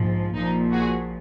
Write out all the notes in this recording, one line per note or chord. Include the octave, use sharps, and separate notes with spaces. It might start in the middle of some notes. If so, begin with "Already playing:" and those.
Already playing: A#1 G#2 F3
A#1 A#2 F3 D#4
F#4 G#4